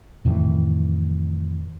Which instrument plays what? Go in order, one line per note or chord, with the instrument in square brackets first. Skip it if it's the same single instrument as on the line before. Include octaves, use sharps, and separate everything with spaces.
[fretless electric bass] F2 A2 D#3 E3